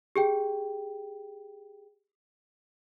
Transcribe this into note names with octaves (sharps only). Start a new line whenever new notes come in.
G4 G#4 G5